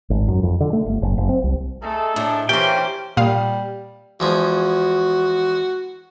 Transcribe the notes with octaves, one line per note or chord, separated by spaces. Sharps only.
G#1
F#2
F2
D3
A3
G1
F#1
F#1
C4
C2
A3 D#4 G#4 A4
A2 D4
E3 A#3 C#4 G4 C5 G5
A#2 G3 F5 D#6
E2 F3 G#3 F#4